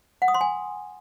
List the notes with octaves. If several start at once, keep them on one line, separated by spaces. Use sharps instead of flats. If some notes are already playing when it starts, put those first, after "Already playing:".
F#5
D#6
C6
G#5